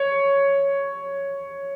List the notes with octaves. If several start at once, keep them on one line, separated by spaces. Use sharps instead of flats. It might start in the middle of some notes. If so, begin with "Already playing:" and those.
Already playing: C#5